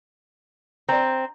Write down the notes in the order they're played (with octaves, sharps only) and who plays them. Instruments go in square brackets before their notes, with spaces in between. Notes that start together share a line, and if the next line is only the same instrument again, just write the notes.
[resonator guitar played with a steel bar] C4 [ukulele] D5 A#5